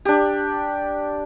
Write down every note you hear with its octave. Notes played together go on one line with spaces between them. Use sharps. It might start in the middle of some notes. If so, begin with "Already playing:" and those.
D4 G4